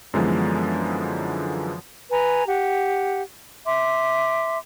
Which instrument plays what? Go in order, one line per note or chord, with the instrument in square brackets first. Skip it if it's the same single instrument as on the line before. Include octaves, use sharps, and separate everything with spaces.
[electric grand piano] F#2 D3 E3 F3 G#3 B3
[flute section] B4 G#5 A#5
G4 F#5
E5 C6 D6